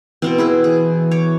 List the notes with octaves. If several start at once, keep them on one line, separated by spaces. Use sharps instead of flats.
B2 E3 B3 C4
E4 G#4 B4
G#4
C#5 D6